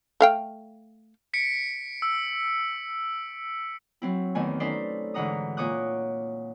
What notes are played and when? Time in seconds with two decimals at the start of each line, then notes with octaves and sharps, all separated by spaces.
0.21 A3 F5 G5
1.34 B6 C#7 D7
2.02 E6
4.02 F#3 C4 E4
4.35 E2 D#3 A3 G#5
4.60 C#4 D#4 A4 B4 C5 D5
5.14 G#2 D3 E3 F#5 A#5 D#6
5.57 A#2 C#5 D6 D#6 F#6